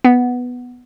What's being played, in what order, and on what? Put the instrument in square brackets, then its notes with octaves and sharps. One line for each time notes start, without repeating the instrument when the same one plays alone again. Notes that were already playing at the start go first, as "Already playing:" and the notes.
[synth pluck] B3